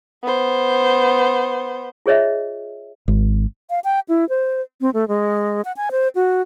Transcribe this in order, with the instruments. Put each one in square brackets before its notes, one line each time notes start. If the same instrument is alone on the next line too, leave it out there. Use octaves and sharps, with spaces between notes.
[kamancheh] B3 C5
[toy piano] F4 G#4 C#5 D#5 E5
[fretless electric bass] G#1
[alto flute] F5
G5
E4
C5
C4
A3
G#3
F#5
G#5
C5
F#4